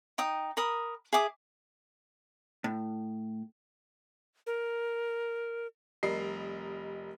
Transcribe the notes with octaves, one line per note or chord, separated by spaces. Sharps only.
D#4 G5 D#6
A#4 B5 D#6
G#4 E5 D6 D#6
A2
A#4
F1 G3 A#4 D#5 C7